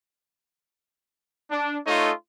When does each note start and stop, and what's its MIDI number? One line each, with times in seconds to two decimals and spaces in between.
1.51 1.78 62
1.87 2.12 57
1.87 2.12 63
1.87 2.12 65
1.87 2.12 69
1.87 2.12 73
1.87 2.12 75